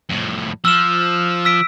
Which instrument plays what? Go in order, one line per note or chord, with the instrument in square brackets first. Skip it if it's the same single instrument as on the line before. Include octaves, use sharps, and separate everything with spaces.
[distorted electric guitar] F2 A2
[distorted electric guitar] F3 [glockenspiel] E6 F6 E7
[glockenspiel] E6 B6 D7